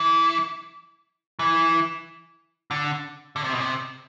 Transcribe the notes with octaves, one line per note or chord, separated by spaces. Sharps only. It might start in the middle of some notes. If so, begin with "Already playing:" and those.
Already playing: E3
E3
D3
D3
C3
B2
C3